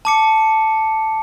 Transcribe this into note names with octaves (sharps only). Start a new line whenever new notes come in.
A5 D6 C#7